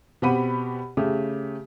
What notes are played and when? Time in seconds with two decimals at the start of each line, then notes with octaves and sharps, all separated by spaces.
0.22 B2 C4 G4 F#5 B5 D#7
0.97 C#3 A3 G4